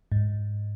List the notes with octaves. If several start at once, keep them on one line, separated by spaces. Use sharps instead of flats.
G#2